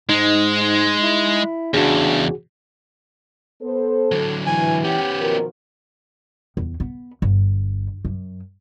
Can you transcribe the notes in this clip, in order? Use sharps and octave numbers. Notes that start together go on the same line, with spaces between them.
G#2 G#3 D#4
E4
E2 C#3 D4 F#4 G#4
B3 A4 C5
D3 F#3
E3 G#5
B3 C#4 G4 G5
B2 D#3 F3 A#4
E2
B3
G1
F#2